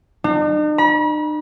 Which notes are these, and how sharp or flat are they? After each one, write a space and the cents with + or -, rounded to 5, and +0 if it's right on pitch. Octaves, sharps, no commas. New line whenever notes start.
D#4 -45
B5 -45